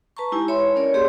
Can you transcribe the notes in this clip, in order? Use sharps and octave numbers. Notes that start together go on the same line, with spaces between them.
B4 A5 A#5 C#6
G#3 D#4 E4 G4 G#5
C#5 E5 B5 C6
C#4 A#4 C#5 D5
A#3 G4 G#4 C#5 D5 C6